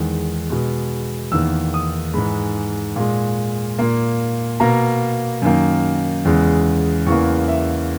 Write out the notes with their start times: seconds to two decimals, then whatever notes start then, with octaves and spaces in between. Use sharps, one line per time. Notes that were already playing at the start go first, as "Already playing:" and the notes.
Already playing: E2 D#3 G#3
0.50 B2 G#3
1.32 E2 D#3 A#3 E6
1.74 D#6
2.14 G#2 E3 G#3 B5
2.96 A#2 G#3
3.79 A#2 A#3
4.60 B2 A#3 A#5
5.42 F#2 D#3 A#3
6.25 E2 C#3 G#3
7.06 E2 C#3 E3 A#3 C#6
7.48 E5